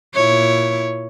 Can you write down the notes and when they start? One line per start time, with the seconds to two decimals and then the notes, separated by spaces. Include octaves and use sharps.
0.14 A#2 E4 C#5